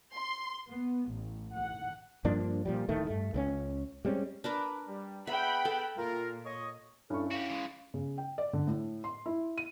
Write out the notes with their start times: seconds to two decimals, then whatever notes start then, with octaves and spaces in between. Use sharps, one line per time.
0.15 C6
0.69 B3
1.11 A1
1.54 F#5
2.25 G2 F3 A#3 D4
2.65 A#2 F3 G3
2.89 D1 A2 D#3 A3
3.07 G2 A3
3.34 C#2 C4 C#4
4.05 G3 G#3 C4 C#4
4.44 D4 A#4 B4
4.88 G3
5.27 B3 G#4 E5 F#5 G5 B5
5.65 A4
5.98 A#2 F4 A#4
6.45 C#5 D#5
7.10 G2 C#4 E4 A4 C#6
7.31 F#4 G4 F5 C#6
7.49 E3 G#3
7.94 C#3
8.18 G5
8.38 D5
8.53 D3
8.67 A2
9.04 C6
9.26 E4
9.58 D#7